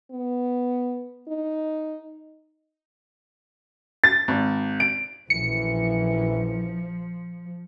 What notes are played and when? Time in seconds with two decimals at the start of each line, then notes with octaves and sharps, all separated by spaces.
0.11 B3
1.28 D#4
4.04 A6
4.28 G#1
4.80 D7
5.30 A#1 F#2 A2 E3 F3 C#7